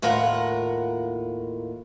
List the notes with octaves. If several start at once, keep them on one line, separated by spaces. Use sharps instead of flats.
D#2 A2 F4 A#4 F#5